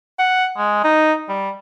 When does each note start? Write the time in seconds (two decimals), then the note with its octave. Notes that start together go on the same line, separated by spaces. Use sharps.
0.19 F#5
0.57 G#3
0.84 D#4
1.29 G3